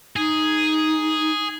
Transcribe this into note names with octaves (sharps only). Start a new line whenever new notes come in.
D#4 G#4